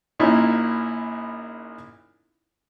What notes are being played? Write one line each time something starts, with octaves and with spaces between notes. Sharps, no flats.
A#1 A#2 C#4 D#4 E4